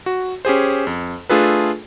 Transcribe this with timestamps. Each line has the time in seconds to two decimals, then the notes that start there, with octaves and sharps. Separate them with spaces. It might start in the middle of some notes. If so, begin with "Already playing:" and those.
0.06 F#4
0.45 C#4 G4 G#4 C5
0.87 F2
1.29 A3 D4 F4 G#4 A4 B4